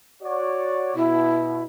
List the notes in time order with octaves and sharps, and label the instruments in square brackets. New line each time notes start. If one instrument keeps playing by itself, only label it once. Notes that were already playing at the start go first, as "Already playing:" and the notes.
[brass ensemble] F#4 C#5 D5
[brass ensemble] B2 [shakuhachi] E4